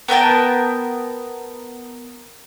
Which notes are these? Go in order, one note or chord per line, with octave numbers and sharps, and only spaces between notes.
B3 A#4 G5 A5